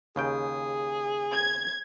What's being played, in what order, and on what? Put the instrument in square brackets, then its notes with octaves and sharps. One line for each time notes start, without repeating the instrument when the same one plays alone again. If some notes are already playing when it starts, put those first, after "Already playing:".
[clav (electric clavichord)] D#2 C#3 G5 [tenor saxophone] G#4
[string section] G#6